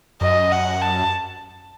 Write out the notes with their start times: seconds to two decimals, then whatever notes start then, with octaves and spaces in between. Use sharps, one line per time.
0.21 F#2 D#5
0.52 F#5
0.81 A5